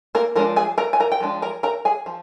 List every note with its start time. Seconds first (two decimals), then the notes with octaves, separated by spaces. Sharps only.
0.15 A#3 A#4
0.36 F3 G#3 D4 A#4
0.56 G#4 G#5
0.78 A#4 A#5
0.93 G#5
1.00 A#4 A#5
1.12 G5
1.20 F3 G#3 D4
1.42 A#4 A#5
1.63 A#4 A#5
1.85 G#4 G#5
2.06 F3